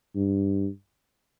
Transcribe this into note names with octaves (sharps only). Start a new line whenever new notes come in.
G2